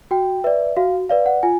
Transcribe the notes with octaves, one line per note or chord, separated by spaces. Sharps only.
F#4 G5
B4 D5 E5
F#4 F5
B4 D5 F5
F#5
F4 G#5